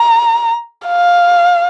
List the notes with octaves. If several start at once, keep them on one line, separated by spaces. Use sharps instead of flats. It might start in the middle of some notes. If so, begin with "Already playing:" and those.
Already playing: A#5
F5